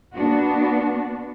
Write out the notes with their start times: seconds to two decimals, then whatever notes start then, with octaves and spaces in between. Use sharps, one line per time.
0.14 A#3 B3 D4 F#4